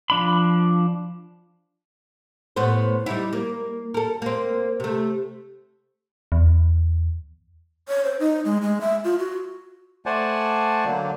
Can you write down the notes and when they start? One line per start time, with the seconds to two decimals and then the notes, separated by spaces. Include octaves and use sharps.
0.10 F3 D4 B5
2.56 A2 B3 C5
3.06 G3 D#4 E4
3.33 A#3
3.94 A4 A#4
4.22 A#3 C4
4.80 C3 A3
6.32 E2
7.88 C#5
8.05 C5
8.20 D#4
8.45 G#3
8.62 G#3
8.81 E5
9.04 F4
9.19 F#4
10.06 A3 C5 D5 F#5 G#5 A5
10.85 D3 F#3 A#3 D4